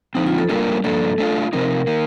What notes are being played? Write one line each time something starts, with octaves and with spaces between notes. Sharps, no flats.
D3 F3 C4 D#4
F4
A4
G3 A#3 D4 F4 A4 A#4
G2 F3 A#3 D4 A4
A3 D4 F4
C3 F3 C4 D#4 A#4
D#3 A#3